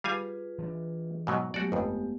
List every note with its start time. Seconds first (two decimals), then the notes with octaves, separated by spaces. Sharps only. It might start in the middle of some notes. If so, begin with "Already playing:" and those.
0.04 G3 F4 G#4 B4 F5 G#5
0.58 E3 C4 D4
1.27 G#2 B2 F#3
1.54 F#3 G#3 A3 B3 F#4 G4 D5
1.72 G1 F2 B3